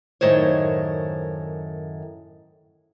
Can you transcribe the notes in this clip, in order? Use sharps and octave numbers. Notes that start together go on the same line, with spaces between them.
F#2 A2 D#3 C5 C#5